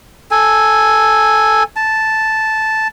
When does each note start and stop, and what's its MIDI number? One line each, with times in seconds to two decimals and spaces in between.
0.31 1.63 69
0.31 1.63 80
1.76 2.88 81